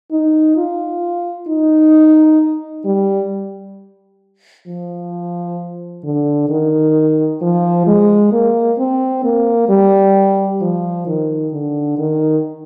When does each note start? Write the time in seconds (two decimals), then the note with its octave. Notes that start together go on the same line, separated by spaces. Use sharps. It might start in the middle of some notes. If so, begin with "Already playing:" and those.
0.11 D#4
0.57 F4
1.48 D#4
2.85 G3
4.67 F3
6.04 D3
6.49 D#3
7.42 F3
7.87 G#3
8.32 A#3
8.79 C4
9.24 A#3
9.69 G3
10.61 F3
11.07 D#3
11.53 D3
11.98 D#3